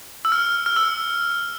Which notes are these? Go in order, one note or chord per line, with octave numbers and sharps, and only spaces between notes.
E6
F6
F6
E6